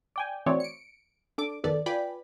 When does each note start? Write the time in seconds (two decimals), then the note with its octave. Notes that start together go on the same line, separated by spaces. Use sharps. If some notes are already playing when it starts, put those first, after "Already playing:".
0.16 D5 G5 G#5
0.46 E3 A3 C4 F#4 C#5 D5
0.60 C#7 D7
1.38 D4 A4 D6
1.64 G#1 F2 D#3 B3 A4 D5
1.86 F4 B4 D5 G5 G#5 B5